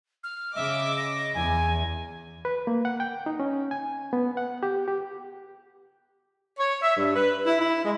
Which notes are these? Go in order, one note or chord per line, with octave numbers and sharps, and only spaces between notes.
F6
C#3 D#5 E5 D6
A#6
E2 G#5
B4
A#3
F#5
G5
D#4
C#4
G#5
B3
F#5
G4
G4
C#5
E5
G2
B4
E4
E4
G#3